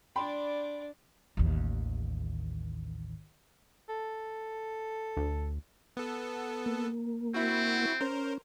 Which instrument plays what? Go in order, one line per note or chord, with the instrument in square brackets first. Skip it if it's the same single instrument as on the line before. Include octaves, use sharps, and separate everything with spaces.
[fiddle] D4 D5 [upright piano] G5 B5 C6
[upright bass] A1 D#2
[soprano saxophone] A4
[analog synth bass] D2
[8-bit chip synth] B3 A4
[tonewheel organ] A#3
[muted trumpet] C4 [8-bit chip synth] E4 F#4
[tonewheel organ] C#4 [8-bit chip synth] A#4 C5